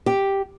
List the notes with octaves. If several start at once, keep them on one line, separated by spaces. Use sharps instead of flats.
G4